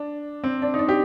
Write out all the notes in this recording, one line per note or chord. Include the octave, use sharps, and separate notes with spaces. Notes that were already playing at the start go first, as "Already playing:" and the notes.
Already playing: D4
C4
D4
D#4
D4
G4